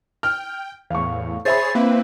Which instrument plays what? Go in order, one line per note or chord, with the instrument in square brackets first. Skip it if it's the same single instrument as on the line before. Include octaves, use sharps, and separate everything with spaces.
[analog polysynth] G5 [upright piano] F6
[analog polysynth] E2 A2 [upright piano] F5 C#6
[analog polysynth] G#4 C#5 C7 [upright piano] C5 E5 B5 [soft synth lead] A6
[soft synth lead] A#3 [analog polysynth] C4 E4 B4